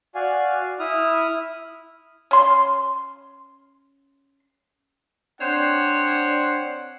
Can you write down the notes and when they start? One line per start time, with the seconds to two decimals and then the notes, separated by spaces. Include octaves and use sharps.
0.15 F#4 D5 F5 G#5
0.80 E4 D#6 F6
2.31 C#4 C6
5.41 C4 D4 C5 C#5 F#5